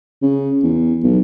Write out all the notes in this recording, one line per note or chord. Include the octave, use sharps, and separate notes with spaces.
C#3
E2
B1